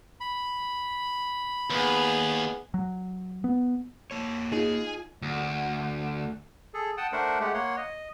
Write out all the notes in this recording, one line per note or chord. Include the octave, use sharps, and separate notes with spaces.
B5
D#2 B3 G#4
F#3
B3
A#3 C#5
D#4 F4 G#4
D2
G#4 A4
F#5 G5 A5 D#6
A3 D4 A#4 C5 F#5
G#3 A3 G4 F#5
A#3 C#5 F#5 C6
D#5